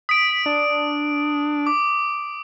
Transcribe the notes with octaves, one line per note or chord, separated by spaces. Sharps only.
D#6 B6 D7
D4
D6